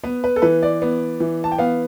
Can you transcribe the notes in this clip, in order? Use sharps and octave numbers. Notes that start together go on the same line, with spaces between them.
B3 B4
B4
A4
E3 B4
D5
B3
E3
A5
G5
B3 F5